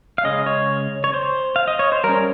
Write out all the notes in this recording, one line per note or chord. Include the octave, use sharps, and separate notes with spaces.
F5
C#3 G#3 C#4 D#5
C#5
C#5
C5
F5
D#5
C#5
C5
G3 C#4 A#4